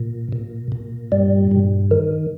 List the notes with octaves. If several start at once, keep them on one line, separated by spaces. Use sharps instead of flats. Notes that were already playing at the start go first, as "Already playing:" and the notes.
Already playing: A#2
A#2
A#2
G2 G3
G2
D#3